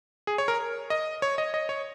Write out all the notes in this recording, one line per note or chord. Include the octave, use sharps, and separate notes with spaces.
G#4
C#5
A#4
D#5
C#5
D#5
D#5
C#5